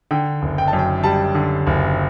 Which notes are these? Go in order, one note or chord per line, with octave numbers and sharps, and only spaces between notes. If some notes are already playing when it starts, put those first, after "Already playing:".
D3 G5
F#1
G5
A5
F#2
G5
G3 A5
D3
F#1